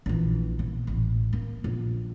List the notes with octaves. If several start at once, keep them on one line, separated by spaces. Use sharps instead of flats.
A#1 E3
B2
A1
A#3
A#1